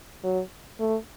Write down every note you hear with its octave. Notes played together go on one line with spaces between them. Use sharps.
F#3
A3